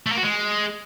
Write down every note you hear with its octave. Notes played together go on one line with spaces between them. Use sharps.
A3
A#3
F#4
G#3